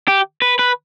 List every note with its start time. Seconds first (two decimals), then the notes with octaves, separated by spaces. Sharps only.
0.08 G4
0.42 B4
0.59 B4